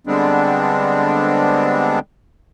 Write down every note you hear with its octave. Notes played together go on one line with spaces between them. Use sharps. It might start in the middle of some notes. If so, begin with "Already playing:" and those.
D3 G3 G#3 B3 C4 D4